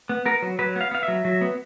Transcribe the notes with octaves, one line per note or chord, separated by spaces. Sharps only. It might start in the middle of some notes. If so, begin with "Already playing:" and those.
B3
B3 A#4
F#3
F#3 B4
B3 F5
B3 F5
E5
F#3
F#3
B3